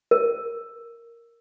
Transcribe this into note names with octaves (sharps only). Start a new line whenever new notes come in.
A#4